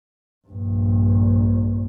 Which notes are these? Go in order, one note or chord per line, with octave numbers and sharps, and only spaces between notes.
A#1 G2